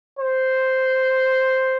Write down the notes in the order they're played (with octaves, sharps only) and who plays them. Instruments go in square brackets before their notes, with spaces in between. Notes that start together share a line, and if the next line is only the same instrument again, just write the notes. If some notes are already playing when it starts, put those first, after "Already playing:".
[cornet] C5